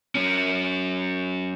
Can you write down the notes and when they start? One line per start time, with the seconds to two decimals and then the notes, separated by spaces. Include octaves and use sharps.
0.15 F#3 C#4